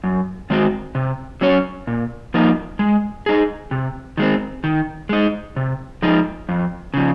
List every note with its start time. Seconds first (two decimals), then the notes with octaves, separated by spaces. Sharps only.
0.04 F#2
0.50 D#3 G#3 C4 F#4
0.95 C3
1.41 F#3 C#4 F#4 C#5
1.87 A#2
2.34 F3 A#3 D#4
2.79 G#3
3.26 D#4 G#4
3.71 C3
4.17 D#3 G#3 C4
4.64 D#3
5.09 G#3 D#4
5.56 C3
6.02 F3 G#3 D#4
6.49 F2
6.94 C#3 F3